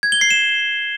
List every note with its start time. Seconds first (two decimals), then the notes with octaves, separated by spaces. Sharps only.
0.03 G#6
0.12 G7
0.21 C7
0.31 E7